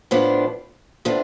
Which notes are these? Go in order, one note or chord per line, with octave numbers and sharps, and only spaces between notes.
A2 F3 B3 D4
A2 F3 B3 D4